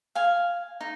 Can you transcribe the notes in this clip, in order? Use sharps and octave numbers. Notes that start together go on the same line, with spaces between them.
F5 G#5
D#4